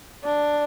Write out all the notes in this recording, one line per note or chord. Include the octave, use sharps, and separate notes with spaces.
D4